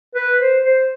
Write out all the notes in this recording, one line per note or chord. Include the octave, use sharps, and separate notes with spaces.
B4
C5
C5